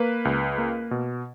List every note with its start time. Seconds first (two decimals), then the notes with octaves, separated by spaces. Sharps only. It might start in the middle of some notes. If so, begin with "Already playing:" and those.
Already playing: A#3 B4
0.25 C#2
0.58 A#3
0.91 B2